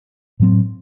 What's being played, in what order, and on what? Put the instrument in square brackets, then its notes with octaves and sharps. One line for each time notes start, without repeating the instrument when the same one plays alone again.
[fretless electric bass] A2 F#3 C4